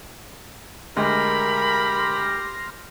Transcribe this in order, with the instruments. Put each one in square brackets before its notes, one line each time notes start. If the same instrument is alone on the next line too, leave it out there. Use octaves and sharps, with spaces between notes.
[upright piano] D2 G#3 [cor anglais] G4 [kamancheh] A#4 B5 [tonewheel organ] C6 F6 A#6